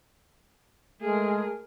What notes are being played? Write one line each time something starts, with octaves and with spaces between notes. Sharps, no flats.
G#3 A3 G#4 A#4